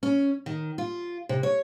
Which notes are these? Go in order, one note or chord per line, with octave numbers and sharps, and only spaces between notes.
C#4
D#3
F4
C3
C#5